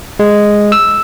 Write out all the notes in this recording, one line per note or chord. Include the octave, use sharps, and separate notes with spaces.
G#3
E6